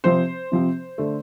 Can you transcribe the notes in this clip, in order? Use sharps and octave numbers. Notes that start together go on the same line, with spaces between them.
C3 F3 C4 C5
C3 F3 C4
D3 A3